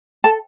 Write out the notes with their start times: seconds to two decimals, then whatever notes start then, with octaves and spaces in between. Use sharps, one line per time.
0.24 A4 A5